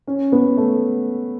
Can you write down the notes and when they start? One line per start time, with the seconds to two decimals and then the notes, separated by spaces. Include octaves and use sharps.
0.07 C#4
0.32 B3
0.57 A3